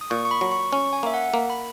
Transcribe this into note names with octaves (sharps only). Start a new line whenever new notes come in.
D#6
A#2 C#6
C#6
B5
F#3
C#6
C#4 C#6
G#5
A#3 E5
F#5
A#3
B5